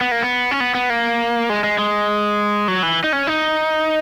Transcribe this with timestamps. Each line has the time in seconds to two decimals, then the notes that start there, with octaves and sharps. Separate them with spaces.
0.01 B3
0.11 A#3
0.23 B3
0.51 C#4
0.60 B3
0.75 B3
0.90 A#3
1.50 G#3
1.64 G#3
1.78 G#3
2.68 F#3
2.83 E3
3.04 D#4
3.13 C#4
3.27 D#4